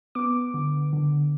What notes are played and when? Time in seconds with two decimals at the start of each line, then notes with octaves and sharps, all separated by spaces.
0.15 B3 D6
0.54 D3
0.93 D3